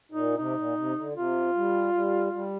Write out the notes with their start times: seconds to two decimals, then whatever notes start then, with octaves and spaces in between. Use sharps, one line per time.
0.12 A#2 D#4
0.37 C3 D#4
0.57 A#2
0.76 C3
0.96 D3
1.15 C3 F4
1.55 G3
1.94 G3
2.33 G3